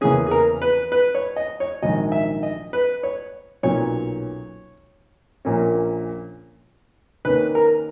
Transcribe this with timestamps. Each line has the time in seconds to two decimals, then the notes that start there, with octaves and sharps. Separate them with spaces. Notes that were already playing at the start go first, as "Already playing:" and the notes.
0.01 E2 C#3 E3 A#3 C#4 G#4
0.27 G#4
0.31 A#4
0.62 B4
0.92 B4
1.15 C#5
1.36 D#5
1.60 C#5
1.82 A#1 G#2 D#3 F#3 D#5
2.12 E5
2.43 D#5
2.73 B4
3.03 C#5
3.63 B1 A#2 F#3 C#4 C#5
5.45 A#1 A#2 A#3 C#4
7.25 D#2 D#3 A#3 C#4 B4
7.55 A#4